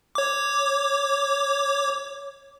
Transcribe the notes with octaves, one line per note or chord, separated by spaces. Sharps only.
C#5 D6